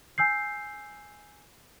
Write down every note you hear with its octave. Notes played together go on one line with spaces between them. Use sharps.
G#5 E6 G6 C7